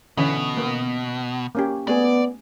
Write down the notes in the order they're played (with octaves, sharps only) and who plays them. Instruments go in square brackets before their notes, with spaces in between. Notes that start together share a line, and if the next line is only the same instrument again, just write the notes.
[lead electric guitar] B2 [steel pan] D3 E3 C#4
[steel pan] A#3 B3
A#3 C#4 G4
[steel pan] A3 G#4 [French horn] B3 [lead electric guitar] D5